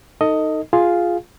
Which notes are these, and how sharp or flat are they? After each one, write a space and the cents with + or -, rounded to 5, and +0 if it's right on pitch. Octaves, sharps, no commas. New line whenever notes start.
D#4 +0 A4 +30 D#5 +5
F4 +0 G#4 +0 F5 +0